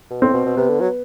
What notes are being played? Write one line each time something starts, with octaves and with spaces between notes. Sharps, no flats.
B2
A2 C4
B2
B2
C3 B3
D3
F#3